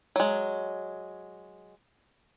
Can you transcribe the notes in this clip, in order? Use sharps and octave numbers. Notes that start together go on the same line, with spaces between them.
F#3 G#3